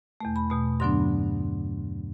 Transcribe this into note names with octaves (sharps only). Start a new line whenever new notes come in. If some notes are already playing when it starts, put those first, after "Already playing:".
E2 B2 A3
B5
E2 B2 A3
G2 D3 F#3 B3 D4 C6